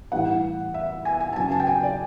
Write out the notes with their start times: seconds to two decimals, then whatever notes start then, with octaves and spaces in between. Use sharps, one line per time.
0.11 A2 E3 G3 F#5
0.74 E5
1.05 G#5
1.20 G#5
1.33 A5
1.36 C#3 F#3 G#5
1.52 A5
1.60 G5
1.67 G#5
1.83 D5